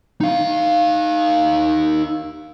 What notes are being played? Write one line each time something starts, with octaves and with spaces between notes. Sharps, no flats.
D#4 F5